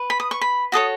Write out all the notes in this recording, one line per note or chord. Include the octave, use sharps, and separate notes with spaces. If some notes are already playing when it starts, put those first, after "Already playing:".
Already playing: B4
B5
D#6
C#6
B5
F#4 A4 C#5 D#6